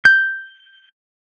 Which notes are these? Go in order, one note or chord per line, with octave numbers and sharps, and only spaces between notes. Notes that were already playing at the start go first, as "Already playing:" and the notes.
G6